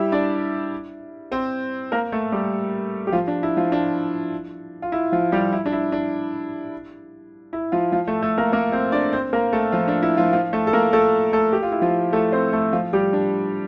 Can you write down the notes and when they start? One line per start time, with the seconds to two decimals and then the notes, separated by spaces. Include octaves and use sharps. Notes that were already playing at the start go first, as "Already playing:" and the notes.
Already playing: G3 E4 G4 E5
0.12 D4 D5
1.31 C4 C5
1.92 A#3 A#4
2.12 A3 A4
2.32 G3 G4
3.07 G4
3.12 F3 F4
3.28 D4
3.43 E4
3.57 F3 F4
3.72 D4
4.82 F4
4.92 E4
5.12 F3 F4
5.32 G3 G4
5.52 E4
5.66 D4
5.72 E4
5.92 D4
7.53 E4
7.72 F3 F4
7.92 F3 F4
8.07 A3 A4
8.22 A3 A4
8.38 A#3 A#4
8.52 A#3 A#4
8.72 C4 C5
8.92 D4 D5
9.13 C4 C5
9.33 A#3 A#4
9.53 A3 A4
9.72 F3 F4
9.88 D4
10.02 E4
10.17 F3 F4
10.33 F3 F4
10.53 A3 A4
10.67 A4
10.73 A#3 A#4
10.93 A3 A4
11.33 A3 A4
11.53 G4
11.63 F4
11.72 E4
11.82 F3 F4
12.13 A3 A4
12.32 C4 C5
12.53 A3 A4
12.73 F3 F4
12.93 G3 G4
13.13 D4